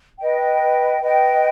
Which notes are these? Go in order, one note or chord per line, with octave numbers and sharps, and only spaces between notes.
B4 D#5 G5
B4 D#5 G5